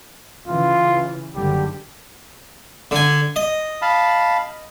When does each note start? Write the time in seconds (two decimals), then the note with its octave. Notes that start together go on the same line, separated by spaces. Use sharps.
0.47 C#3 E3 F4
1.35 F#1 D3 G3 G4
2.91 D3 G#5
3.36 D#5
3.82 F5 A5 B5